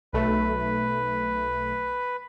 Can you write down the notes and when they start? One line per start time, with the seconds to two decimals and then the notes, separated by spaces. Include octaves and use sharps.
0.13 B1 A3 B4